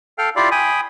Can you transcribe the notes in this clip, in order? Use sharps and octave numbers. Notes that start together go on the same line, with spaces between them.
A4 F5 G5 F6
E4 F4 G4 D5 F5
G5 G#5 B5 D#6